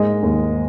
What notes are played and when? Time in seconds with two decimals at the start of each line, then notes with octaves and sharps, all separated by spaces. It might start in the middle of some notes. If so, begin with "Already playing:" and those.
Already playing: G#2 G#3 A#3 D#5
0.23 D#2